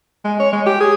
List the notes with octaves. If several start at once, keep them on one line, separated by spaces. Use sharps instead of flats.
G#3
C#5
G#3
G4
G#4